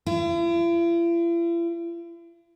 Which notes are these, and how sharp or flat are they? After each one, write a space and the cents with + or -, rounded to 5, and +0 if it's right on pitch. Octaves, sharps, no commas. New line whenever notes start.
E4 +45